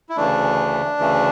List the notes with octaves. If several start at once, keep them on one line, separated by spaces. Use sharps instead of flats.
E4
D2 C#3 E3 A3 D4
D2 C#3 E3 A3